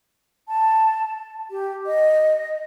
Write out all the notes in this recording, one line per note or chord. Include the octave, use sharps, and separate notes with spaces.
A5
G4
D#5